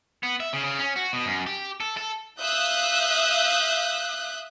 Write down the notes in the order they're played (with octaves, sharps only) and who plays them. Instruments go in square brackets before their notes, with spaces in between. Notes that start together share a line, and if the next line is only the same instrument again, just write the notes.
[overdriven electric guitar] B3
E5
C#3
C#3
C#4
F#4
B2
F#2
G4
A4
A4
[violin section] E5 F5 D#6 E6 F#6 G6